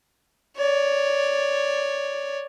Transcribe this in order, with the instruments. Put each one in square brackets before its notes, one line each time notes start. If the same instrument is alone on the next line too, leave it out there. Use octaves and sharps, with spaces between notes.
[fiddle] C#5 D5